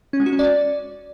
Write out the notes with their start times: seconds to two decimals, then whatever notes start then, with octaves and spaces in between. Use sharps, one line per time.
0.13 C#4
0.20 G#3
0.26 F#4
0.33 C#4
0.39 D5